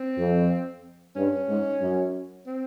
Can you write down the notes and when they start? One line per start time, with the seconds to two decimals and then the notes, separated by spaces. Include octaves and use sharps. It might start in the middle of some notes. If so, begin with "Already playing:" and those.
Already playing: C4
0.17 F2
1.16 G2 C#4
1.48 G#2
1.81 F#2
2.47 C4